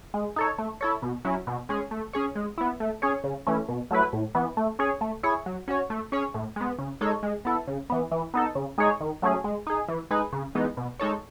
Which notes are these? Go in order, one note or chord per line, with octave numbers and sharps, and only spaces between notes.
G#3
D#4 A4 C#5
A3
E4 A4 C#5
B2
F#3 C#4 E4
B2
G#3 C#4 G#4
A3
C#4 G#4 C#5
G#3
B3 E4
A3
C#4 G#4 C#5
C#3
E3 A3 C#4
B2
F#3 A3 E4 B4
A2
E3 B3
A3
C#4 G#4 C#5
A3
E4 G#4 C#5
F#3
C#4 F#4 C#5
A3
C#4 G#4 C#5
A2
G#3 B3
C#3
G#3 D#4 A4 C#5
G#3
B3 E4 A4
C#3
E3 B3
E3
B3 D#4 A4
C#3
G#3 D#4 G#4 C#5
D#3
F#3 A3 C#4 G#4
G#3
D#4 G#4
E3
G#3 D#4 G#4 B4
C#3
E3 G#3 B3 D#4
B2
G#3 D#4 A4 C#5